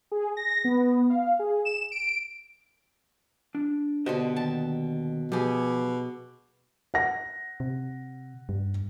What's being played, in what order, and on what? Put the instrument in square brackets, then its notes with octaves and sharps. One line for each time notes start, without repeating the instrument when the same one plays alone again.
[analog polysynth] G#4
A#6
B3
F5
G#4
E7
D7
[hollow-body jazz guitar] D4
[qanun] B2 D3 F#4 [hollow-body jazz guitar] G4 C5 D#5
[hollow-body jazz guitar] D#2 [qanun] A5
[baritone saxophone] B2 [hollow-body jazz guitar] F3 [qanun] G4 G#4
[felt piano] F#5 A#6
[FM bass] C3
G2